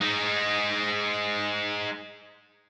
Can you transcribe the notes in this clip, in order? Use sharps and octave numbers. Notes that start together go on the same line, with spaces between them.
G#3 D#4